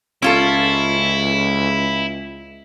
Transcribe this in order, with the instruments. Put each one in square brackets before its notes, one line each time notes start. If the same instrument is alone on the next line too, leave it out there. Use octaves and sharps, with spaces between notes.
[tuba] C#2 [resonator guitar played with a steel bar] C#4 F4 A4 [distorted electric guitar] E4